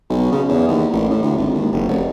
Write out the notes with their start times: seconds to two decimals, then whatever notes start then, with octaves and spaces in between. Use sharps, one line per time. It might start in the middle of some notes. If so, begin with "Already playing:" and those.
0.10 B1
0.32 C#3
0.49 E2
0.68 D#2
0.93 A1
1.10 A2
1.23 D2
1.38 G#1
1.54 D#2
1.72 F#1
1.88 F1